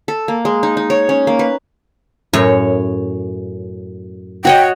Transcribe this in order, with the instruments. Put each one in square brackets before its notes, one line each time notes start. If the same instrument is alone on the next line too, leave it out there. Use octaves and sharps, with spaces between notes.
[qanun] A4
A#3
G#3
D#4
D#4
C#5
C#4
A#3
B4
[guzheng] F#2 A2 [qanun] C#5
[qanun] F#4 C#5 D#5 [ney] G5